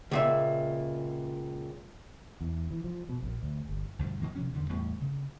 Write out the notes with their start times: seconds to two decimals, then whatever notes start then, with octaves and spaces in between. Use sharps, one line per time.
0.11 C#2 A#2 E5
2.41 E2
2.70 E3
2.84 F3
3.09 B2
3.22 A#1
3.43 D2
3.69 G1
3.99 D2 G2 B2 F3
4.22 F#2 D#3 F3 A#3
4.35 C3 F3 F#3 C#4
4.53 E2 G2 D3
4.69 E2 A2 G3 B3
5.01 C#3